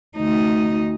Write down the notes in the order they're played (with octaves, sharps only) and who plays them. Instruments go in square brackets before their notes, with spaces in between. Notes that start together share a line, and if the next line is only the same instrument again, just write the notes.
[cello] D2 D#4